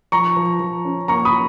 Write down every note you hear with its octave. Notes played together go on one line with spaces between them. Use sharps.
F3 A#5 C#6
F3
F3
C#4
A#3 A#5 C#6
B5 D#6